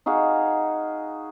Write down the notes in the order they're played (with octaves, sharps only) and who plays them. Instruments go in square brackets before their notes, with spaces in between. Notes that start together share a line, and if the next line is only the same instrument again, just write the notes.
[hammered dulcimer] D#4 F#4 G#4 F5